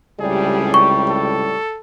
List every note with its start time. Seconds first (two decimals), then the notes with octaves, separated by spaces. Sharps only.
0.20 C#2 A2 C3 G3 G#4
0.74 C#6
1.10 A4